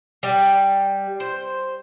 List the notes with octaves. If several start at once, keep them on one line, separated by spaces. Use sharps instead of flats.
G3
C5